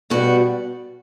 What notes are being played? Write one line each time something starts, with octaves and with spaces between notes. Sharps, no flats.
B2 G3 F#4